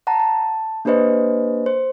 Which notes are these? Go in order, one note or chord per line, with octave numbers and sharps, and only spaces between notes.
F#5 A5 A#5
A5
A#3 D4 G4 B4 C5 D#5
C5